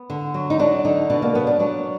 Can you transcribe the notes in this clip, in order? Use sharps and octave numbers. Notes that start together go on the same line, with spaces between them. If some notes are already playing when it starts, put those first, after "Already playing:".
Already playing: B3
D3
F#3
D#4
F#3 D4
D3 D#4
B2 D4
A#3
F#3 B3
D4
F#3 D4